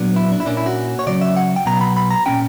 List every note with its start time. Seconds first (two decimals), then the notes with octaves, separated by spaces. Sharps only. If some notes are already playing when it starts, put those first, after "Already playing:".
Already playing: A#2 F#3 B3 D4
0.16 E4
0.32 D4
0.40 E4
0.46 A#2 A#3 C#4 D4
0.57 E4
0.66 F#4
0.99 C#5
1.07 C#3 F#3 C#4 D5
1.21 E5
1.37 F#5
1.56 G5
1.66 B2 F#3 B3 A#5
1.81 B5
1.97 B5
2.11 A#5
2.26 A#2 A#3 C#4 G5